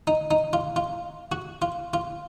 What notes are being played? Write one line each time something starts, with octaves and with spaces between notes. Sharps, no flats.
D#4
D#4
F4
F4
F#4
F4
F4